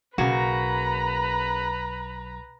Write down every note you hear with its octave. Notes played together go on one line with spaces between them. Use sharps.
B1 C#3 A#3 F#4 B4 A#5